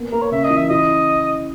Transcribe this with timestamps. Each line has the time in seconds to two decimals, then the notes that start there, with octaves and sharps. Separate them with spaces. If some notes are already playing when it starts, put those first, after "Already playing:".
Already playing: A#3 B3
0.12 A#3 A#4
0.22 C#5
0.31 C#3 E5
0.44 D#5
0.50 E3
0.57 E5
0.70 E4 D#5